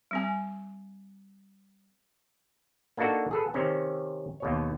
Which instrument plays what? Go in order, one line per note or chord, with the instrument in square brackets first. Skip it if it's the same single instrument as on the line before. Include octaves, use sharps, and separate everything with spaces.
[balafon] G3 C4 G#5
[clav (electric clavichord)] A#3 D4 D#4 F#4 A4
G#4 A4 B4
C3 D#3 C4 C#4
D#2 B2 C#5